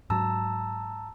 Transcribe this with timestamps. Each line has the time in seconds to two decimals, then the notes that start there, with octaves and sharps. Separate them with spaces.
0.10 G#2 F#3 A5 A#5 E6